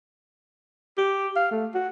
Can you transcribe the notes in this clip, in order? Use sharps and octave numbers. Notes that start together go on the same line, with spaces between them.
G4
F5
A3
F#4